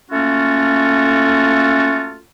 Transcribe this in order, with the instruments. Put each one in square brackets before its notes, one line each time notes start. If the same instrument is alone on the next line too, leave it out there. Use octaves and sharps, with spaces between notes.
[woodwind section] A3 A#3 C#4 F4 F#4 A4